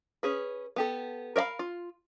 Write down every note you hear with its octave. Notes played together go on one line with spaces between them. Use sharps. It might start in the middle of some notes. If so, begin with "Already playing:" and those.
C#4 G#4 B4
B3 G4 A4
A#4 C#5 E5 F5 B5
F4